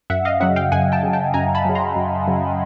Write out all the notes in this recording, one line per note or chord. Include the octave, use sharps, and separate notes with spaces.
F#2 E5 F#5
D#5 F5
C#3 F#3 E5 F#5
F5 G5
F#2 F#5 G#5
G5 A5
C#3 F#3
G5 A5
F#2 G#5 A#5
A5 B5
C#3 F#3
A#5 C6
F#2
C#3 F#3